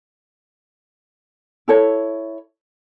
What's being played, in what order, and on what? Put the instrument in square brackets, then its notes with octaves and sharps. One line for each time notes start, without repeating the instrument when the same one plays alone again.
[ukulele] E4 A4 C#5